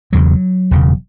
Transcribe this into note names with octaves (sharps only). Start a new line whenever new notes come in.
E1 E2 C#3 F#3
E1 E2 C#3